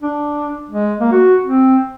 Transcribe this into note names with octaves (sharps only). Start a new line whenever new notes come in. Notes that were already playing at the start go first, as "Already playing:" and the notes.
D4
G#3
A#3
F#4
C4